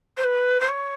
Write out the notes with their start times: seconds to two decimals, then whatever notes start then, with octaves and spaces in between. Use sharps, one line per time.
0.17 C5
0.24 B4
0.60 C5
0.69 C#5